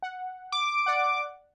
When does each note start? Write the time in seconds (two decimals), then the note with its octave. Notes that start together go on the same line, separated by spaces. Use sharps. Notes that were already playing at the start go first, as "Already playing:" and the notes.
0.02 F#5
0.52 D6
0.86 D5 F#5